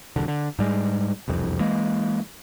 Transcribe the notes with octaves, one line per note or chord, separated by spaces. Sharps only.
E1 C2 D3
D3
G#2 G3 G#3
E1 C2 F2
E3 G#3 A#3